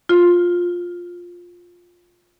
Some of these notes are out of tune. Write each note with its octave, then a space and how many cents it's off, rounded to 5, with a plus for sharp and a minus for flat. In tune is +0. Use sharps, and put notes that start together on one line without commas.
F4 +10